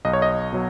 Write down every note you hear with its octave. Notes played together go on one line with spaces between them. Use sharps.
B1 D#5
C#5
D#5
B2 F#3